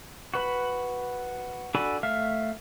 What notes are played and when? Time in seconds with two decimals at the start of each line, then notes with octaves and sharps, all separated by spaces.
0.34 F#4 B4 B5
1.75 D4 F#4 A4 G#5 B5
2.03 A3 E5 F5 F6